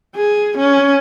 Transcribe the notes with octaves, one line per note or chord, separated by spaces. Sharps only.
G#4
C#4